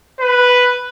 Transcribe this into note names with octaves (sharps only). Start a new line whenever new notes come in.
B4